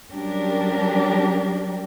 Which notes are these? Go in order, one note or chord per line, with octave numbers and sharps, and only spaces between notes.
F#3 G3 C#4 D4 G4 A#4